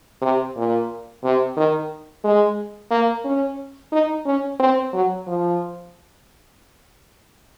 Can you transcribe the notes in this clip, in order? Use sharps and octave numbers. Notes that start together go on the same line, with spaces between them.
C3
A#2
C3
D#3
G#3
A#3
C#4
D#4
C#4
C4
F#3
F3